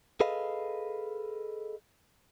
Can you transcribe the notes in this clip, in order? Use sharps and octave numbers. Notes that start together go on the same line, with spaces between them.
G#4 A4 B4 D#5 F5